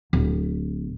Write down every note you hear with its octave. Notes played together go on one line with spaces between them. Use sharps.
D1